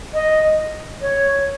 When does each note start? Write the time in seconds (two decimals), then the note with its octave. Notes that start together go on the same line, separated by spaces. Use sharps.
0.14 D#5
1.01 C#5